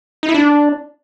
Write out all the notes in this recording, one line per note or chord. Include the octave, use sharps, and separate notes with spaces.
D#4
E4
D4